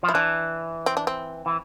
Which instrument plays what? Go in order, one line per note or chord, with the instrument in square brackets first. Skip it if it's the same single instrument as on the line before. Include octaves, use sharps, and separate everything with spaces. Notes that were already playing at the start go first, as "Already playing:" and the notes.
[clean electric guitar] F3
[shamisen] E4
[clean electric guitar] E3 [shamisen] D4
[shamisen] C4
D4
C4
[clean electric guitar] E3